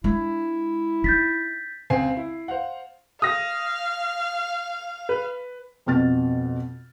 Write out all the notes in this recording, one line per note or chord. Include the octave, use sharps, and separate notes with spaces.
G#3 D4 E4
D#4 G6 A6 B6
C#2 C4 G#5 C7
E4
C5 F5 F#5
F5 D#6 A#6
B4
F2 B2 F6 A6